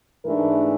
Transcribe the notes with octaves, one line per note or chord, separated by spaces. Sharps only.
G#2 E3 A3 D4 A#4